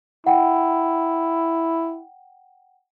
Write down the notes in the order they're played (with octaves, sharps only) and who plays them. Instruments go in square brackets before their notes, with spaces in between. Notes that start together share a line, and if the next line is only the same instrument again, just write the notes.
[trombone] E4 [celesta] F#5 G5